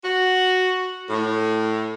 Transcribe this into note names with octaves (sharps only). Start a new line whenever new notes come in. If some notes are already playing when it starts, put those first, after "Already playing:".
F#4
A2